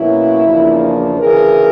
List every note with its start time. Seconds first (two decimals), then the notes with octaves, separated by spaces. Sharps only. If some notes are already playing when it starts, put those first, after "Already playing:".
Already playing: B2 F#3 A#3 C#4 E4
0.43 E2 C#3 F3 A#3 D4
1.20 D2 C#3 E3 G#4 A#4